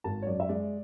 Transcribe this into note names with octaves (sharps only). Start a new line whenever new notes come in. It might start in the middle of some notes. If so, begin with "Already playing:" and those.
G#1 A5
C#5
F#2 D5
E5
G#3 D5